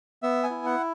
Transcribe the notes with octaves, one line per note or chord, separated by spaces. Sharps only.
B3 E5
G#5
E4
F#5